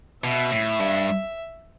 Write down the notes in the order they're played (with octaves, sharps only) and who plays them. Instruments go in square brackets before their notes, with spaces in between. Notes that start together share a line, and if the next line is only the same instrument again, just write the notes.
[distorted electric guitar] B2 [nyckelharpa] E5
[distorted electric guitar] A2
G2